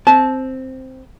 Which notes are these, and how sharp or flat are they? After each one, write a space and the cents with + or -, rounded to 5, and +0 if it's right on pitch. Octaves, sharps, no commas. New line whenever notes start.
C4 +0 A5 -25